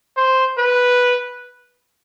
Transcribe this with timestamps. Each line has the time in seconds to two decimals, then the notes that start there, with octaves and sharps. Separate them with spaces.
0.16 C5
0.58 B4